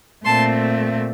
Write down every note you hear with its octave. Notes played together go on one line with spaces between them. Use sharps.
A#2 A3 C4 A5 C6